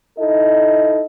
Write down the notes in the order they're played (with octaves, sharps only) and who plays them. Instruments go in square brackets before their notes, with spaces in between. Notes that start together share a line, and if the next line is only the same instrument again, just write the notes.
[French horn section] D#4 E4 A4 D#5